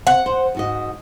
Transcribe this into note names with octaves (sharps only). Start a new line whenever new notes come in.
C4 F#5
C5
G#2 F#4 D#5